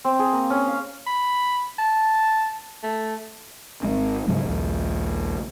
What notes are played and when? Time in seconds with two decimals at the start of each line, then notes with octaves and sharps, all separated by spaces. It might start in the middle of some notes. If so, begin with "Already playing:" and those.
0.04 C4
0.19 G#4
0.33 A#3
0.50 C#4
0.67 F5
1.07 B5
1.79 A5
2.83 A3
3.83 G#1 G#3 C4
4.28 G#2 C#3 F#3 G#3
4.45 A#1 D#2